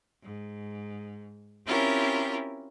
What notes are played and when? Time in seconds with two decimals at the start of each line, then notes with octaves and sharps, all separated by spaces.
0.22 G#2
1.65 C4 C#4 E4 F4 G4 A#4